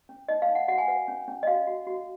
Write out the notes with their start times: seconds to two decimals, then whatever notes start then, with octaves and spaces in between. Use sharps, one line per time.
0.09 C#4
0.28 D#4 D#5
0.42 F5
0.48 D#4
0.55 F#5
0.68 F#4 F#5
0.78 G#5
0.88 B4 F#5
1.08 C#4
1.28 C#4
1.43 D#5
1.47 F#4 F5
1.67 F#4
1.87 F#4